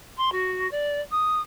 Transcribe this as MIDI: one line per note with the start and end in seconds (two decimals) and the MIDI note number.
0.18 0.30 84
0.32 0.70 66
0.71 1.01 74
1.11 1.41 87